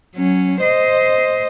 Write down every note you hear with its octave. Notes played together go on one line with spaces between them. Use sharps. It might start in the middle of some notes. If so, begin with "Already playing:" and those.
F#3 C#4
C5 D#5